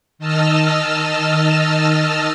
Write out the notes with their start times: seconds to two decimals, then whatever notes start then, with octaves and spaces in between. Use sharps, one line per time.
0.19 D#3 D#5 A5 E6 F6